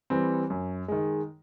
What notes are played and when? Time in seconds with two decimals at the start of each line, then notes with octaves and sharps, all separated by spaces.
0.10 E3 G3 C4
0.50 F#2
0.88 D#3 G#3